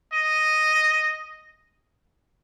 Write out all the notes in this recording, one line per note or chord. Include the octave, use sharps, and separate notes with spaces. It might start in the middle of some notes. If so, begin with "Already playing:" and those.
D#5